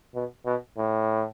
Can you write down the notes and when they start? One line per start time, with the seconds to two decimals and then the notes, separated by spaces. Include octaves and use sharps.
0.15 B2
0.46 B2
0.77 A2